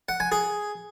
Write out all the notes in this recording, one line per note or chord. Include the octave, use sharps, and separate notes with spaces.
F#5
G#5
G#4